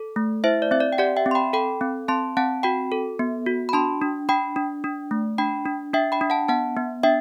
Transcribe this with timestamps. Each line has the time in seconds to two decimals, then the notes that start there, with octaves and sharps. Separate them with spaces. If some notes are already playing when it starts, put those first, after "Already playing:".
Already playing: A4
0.16 A3
0.44 E4 C5 E5
0.62 D5
0.71 C4 E5
0.80 D5
0.93 G5
0.98 G4 D5 F#5
1.17 E5 G5
1.26 C4
1.31 C6
1.35 G5 B5
1.53 A4 G5 B5
1.81 C4
2.08 C4 A5 C6
2.37 C4 F#5 A5
2.63 F#4 G5 B5
2.92 A4
3.19 B3
3.46 F#4
3.69 B5
3.73 D4 A5 C6
4.02 D4
4.29 D4 G5 B5
4.56 D4
4.84 D4
5.11 A3
5.38 D4 G5 B5
5.66 D4
5.93 D4 E5 G5
6.12 G5 B5
6.21 D4
6.30 F#5 A5
6.48 B3 F#5 A5
6.77 B3
7.03 D4 E5 G5